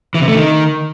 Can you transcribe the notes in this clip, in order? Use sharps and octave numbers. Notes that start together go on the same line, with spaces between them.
E3
C3
A3
D#3